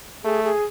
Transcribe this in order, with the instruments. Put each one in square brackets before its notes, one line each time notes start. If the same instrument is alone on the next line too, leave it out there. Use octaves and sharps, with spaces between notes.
[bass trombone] A3 [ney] G#4
[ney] G#4